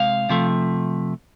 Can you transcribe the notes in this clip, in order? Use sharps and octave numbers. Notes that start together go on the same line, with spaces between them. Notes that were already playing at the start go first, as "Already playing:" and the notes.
Already playing: C3 G#3 F5
C3 F3 A3